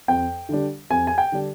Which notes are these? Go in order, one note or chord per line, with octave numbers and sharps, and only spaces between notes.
F2 G5
D3 G3 D4
F2 G#5
G#5
G5
D3 G3 D4